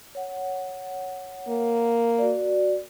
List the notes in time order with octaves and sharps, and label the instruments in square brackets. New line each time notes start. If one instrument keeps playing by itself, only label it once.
[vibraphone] C#5 F#5
[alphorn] A#3
[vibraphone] F#4 D5